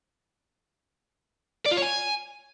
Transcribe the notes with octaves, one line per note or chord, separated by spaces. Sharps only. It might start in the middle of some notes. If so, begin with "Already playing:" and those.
D5
F4
C#5
G#5